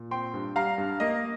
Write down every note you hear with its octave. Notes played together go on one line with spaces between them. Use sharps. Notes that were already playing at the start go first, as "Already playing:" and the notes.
Already playing: A#2
C4 G5 C6
G2
G3 F5 A#5
G2
A#3 D#5